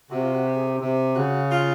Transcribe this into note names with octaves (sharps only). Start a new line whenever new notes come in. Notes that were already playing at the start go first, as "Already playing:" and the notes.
C3 F#4
F4
F#4
G4
G#4
G4
C3
C#3 F#4
F4